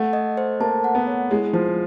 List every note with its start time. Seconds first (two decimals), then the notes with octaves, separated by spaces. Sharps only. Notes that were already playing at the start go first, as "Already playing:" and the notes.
Already playing: A3 F#5
0.13 D#5
0.37 C5
0.60 A#3 A5
0.84 F#5
0.95 B3
1.07 C#5
1.30 G#3 E4
1.53 F3 C5